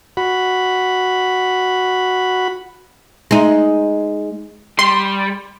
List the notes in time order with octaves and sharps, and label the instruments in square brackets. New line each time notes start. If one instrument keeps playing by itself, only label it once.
[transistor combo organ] F#4 B5
[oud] G#3 D#4
[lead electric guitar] G3 [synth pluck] C6